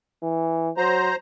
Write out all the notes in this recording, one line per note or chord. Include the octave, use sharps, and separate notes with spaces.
E3
F#3 C5 A#5